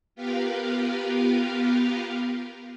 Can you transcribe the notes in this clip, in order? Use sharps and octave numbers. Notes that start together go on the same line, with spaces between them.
B3 F4 G4 A#4 B4 F5